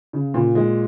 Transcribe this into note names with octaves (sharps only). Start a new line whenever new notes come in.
C#3
A#2
G#3